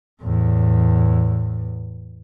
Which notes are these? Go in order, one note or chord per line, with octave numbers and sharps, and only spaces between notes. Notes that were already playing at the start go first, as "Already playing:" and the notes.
E2 A2